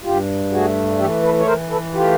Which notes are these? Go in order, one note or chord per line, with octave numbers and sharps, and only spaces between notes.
G2 F4 G4
A3 F#4 G#4
E3 G4 A4
A4 B4
C#5
E3 A#4 C5
A4 B4
A3 F4 G4